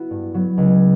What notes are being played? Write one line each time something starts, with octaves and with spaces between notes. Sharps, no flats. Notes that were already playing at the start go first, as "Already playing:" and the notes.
Already playing: B3 E4 F#4
G2
F#3 B3
C#2